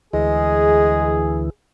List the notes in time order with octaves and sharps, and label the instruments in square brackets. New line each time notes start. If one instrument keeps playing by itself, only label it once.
[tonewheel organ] D2 E3 [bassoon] G#3 [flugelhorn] G#4